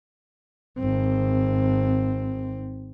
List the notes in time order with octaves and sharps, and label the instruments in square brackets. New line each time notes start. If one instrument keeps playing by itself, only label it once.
[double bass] G#1 C4